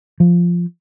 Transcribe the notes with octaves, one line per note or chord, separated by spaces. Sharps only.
F3